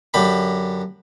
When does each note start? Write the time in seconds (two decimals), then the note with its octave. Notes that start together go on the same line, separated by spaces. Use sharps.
0.14 F#2 D3 G4 B5